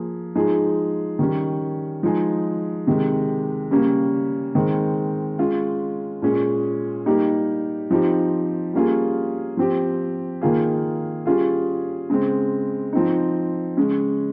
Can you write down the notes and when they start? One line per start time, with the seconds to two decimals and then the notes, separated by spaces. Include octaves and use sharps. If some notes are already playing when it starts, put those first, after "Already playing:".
Already playing: F3 A#3 G#4
0.35 F3 G#3 D#4 G#4
1.19 D#3 G3 C#4
2.03 F3 G#3 D#4 G#4
2.87 C3 D#3 G#3
3.71 C#3 G3 A#3 C#4
4.55 D#3 G#3 C4
5.39 G#3 C#4 F4
6.22 A#2 G#3 C#4 G#4
7.06 G3 A#3 D#4 G4
7.91 F3 C4 D#4 G4
8.74 G3 A#3 C#4 F4 G#4
9.57 F3 C4 G4
10.42 D#3 A#3 F4 G#4
11.26 G3 C#4 F4 G#4
12.10 C#3 G#3 C4
12.93 F3 C4 D#4
13.77 C#3 G#3 C#4